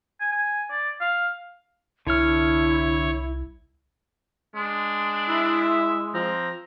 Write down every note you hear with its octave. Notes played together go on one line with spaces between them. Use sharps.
G#5
G#5
D5
F5
C2 D3 E4 C#5 F6
G#3 D4
E4 E5
F3 C4 A#5